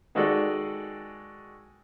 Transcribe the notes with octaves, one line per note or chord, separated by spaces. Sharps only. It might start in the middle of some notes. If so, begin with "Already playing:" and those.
D#3 G#3 F#4 G#4 A4 D5